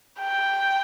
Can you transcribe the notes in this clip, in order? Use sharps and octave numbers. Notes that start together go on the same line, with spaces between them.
G5